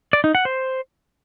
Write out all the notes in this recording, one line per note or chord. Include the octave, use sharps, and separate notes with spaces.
D5
D#4
F#5
C5